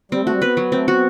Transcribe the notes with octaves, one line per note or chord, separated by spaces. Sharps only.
G3 C4
A3
G3 F#4
B3 B4
F#3
A3 C4
B3 F#4